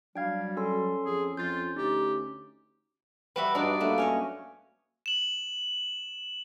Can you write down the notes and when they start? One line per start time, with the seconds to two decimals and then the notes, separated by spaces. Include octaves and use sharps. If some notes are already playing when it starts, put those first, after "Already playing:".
0.15 F#3 G3 D4 F5 G5 G#6
0.57 C#4 A4 C6
1.05 F2 G#4
1.37 F2 F4 G6 A6
1.76 D2 D#4 G4
3.36 G3 F#4 B4 E5
3.55 G2 F#3 D4 D#4 D5
3.80 A3 A#3 D4 B4
3.98 C#4 C#5 D#5
5.06 E7 F#7